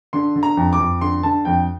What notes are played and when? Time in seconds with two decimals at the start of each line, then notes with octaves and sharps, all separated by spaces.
0.13 D3 C6
0.36 D3
0.43 A#5
0.57 F2
0.73 D6
0.79 F2
1.01 D3 C6
1.23 D3 A5
1.45 F2 G5